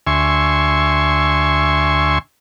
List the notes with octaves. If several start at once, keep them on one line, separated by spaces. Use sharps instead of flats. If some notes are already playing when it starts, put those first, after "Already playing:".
D2 E5 G#5 C6 C#6